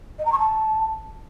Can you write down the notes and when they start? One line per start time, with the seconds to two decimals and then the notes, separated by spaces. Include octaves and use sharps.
0.19 D#5
0.25 A#5
0.32 C#6
0.39 A5